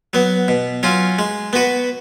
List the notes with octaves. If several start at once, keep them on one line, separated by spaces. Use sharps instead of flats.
F#3 B3
B2
F#3 C#4 F4
G#3
B3 F#4 B4